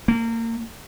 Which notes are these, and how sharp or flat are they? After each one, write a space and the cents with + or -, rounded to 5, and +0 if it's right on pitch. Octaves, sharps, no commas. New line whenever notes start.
A#3 -30